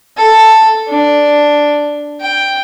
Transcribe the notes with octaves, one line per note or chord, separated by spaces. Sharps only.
A4
D4
G5